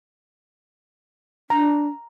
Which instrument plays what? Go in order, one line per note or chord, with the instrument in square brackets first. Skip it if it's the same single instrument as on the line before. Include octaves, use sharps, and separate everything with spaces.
[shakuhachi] D4 [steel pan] A#5